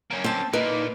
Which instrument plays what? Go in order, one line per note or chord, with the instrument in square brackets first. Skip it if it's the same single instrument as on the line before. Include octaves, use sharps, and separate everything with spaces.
[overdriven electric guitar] A#3 C#4
[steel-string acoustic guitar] C4 A5
[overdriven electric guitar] A#2 A#3 [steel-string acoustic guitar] D#4 [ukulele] B4